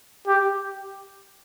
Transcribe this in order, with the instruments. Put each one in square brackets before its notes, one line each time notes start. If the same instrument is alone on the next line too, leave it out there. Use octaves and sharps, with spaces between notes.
[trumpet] G4